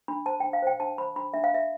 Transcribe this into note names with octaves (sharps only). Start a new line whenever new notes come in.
D4 B5
C5 A5
G5
D4
F5
C5 G5
D4 A5
C5 B5
D4 B5
D4 E5
F5
D4 E5